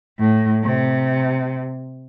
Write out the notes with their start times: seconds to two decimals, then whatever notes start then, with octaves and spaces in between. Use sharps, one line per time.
0.19 A2
0.63 C3